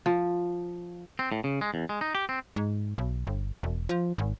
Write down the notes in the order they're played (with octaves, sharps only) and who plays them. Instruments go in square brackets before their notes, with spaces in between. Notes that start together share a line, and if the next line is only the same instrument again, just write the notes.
[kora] F3
[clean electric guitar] C4
A2
C#3
G#3
E2
G#3
D#4
G4
C4
[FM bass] G#2
B1
G1
E1
F3
G#1